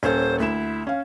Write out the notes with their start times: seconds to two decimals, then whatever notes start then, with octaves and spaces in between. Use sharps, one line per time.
0.03 D#1 C#4 A4 C5
0.40 D2 E4 E7
0.87 C#4 F5